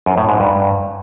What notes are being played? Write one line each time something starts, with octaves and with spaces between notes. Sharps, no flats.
F#2
A2
G#2
G2